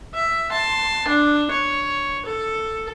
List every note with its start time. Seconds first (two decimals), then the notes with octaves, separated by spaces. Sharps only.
0.15 E5
0.51 A5 C6
1.08 D4
1.51 C#5
2.26 A4